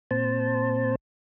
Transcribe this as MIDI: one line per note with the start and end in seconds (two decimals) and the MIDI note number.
0.11 0.95 46
0.11 0.95 60
0.11 0.95 72
0.11 0.95 81